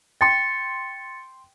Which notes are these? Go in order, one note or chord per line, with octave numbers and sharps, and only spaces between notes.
G5 C6 A6 C#7